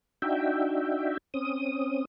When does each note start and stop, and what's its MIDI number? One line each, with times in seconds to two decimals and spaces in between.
0.22 1.17 62
0.22 1.17 63
0.22 1.17 66
0.22 1.17 76
0.22 1.17 79
1.34 2.05 60
1.34 2.05 61
1.34 2.05 87